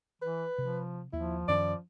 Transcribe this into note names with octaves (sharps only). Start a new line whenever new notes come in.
E3 B4
C3 F3
D#2 F3 E4
F#2 D#3 C#4 D5